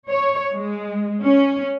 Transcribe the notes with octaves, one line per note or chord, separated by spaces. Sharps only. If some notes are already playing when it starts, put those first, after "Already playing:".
C#5
G#3
C#4